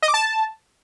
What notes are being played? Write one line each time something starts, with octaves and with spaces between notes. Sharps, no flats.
D#5
D6
A5